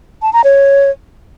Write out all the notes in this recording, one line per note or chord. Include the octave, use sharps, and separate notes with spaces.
A5
A#5
C#5